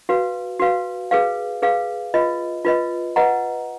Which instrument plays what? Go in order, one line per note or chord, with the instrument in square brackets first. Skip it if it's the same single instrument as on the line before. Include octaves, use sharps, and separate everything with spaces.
[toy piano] F#4 B4 F5
F#4 B4 F5
G#4 B4 F5
G#4 B4 F5
F4 B4 D#5
F4 B4 D#5
B4 D#5 F#5 A#5